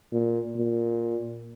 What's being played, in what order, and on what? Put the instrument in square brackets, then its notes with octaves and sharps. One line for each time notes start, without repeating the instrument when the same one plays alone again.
[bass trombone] A#2
A#2